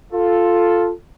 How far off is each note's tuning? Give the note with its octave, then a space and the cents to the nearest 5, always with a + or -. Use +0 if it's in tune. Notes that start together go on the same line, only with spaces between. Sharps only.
F4 +0 A4 +0